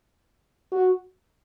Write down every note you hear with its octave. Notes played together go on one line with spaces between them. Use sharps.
F#4